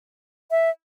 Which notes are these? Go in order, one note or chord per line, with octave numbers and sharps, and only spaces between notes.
E5